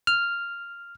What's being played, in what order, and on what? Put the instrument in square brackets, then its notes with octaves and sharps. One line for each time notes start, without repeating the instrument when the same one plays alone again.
[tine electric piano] F6